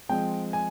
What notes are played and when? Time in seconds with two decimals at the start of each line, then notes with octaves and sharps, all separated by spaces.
0.09 F3 G#3 C4 G5
0.53 G#5